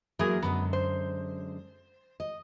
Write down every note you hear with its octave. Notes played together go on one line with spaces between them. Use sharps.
E3 F#3 A#3 G#4 A#4
F#2 D3 G#3 B3
C5
D#5